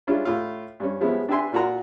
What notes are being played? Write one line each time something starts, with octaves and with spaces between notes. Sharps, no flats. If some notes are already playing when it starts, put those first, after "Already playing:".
G3 G#3 C#4 D4 E4 F4
A2 F4
G2 G3 C#4
F3 G3 G#3 B3 C#4 E4
D4 G4 B4 E5 G#5 C6
A#2 F4 F#4 A#4 A#5 C6